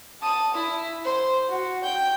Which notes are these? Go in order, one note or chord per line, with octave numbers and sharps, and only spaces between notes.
A5 D#6
E4
C5
F#4
G5 G6